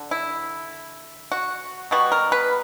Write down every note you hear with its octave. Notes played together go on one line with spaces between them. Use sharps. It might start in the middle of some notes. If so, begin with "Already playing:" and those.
Already playing: D3
E4
F#4
B2 G3 B3 F#4
A#4
B4